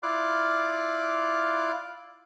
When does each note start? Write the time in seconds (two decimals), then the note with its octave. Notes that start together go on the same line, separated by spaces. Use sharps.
0.03 E4 F4 D5 F5 D6 F#6